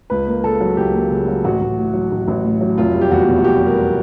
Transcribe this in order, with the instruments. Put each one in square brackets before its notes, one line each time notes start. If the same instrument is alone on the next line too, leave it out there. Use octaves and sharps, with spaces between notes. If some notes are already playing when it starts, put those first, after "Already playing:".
[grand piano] C#2 B4
A#3
C#3 A4
F#3
C#2 G4
A#3
C#3
F#3
A1 F#4
A1
A2
F#3
A1
A1
A2
F#3
F1 F4
G3
G4
E2 F#4
B2
F#4
F1 G4
G3
A#4